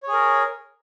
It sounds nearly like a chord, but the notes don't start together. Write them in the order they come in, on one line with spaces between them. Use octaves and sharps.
C#5 G#4 A#4